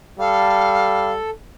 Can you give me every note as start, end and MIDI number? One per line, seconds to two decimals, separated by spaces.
0.19 1.19 55
0.19 1.30 69
0.19 1.12 77